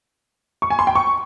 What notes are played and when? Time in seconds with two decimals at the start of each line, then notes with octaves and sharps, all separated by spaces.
0.62 C#6
0.70 G#5
0.79 C6
0.87 G5
0.95 C#6